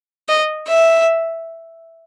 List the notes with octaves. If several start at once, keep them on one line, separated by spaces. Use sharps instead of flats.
D#5
E5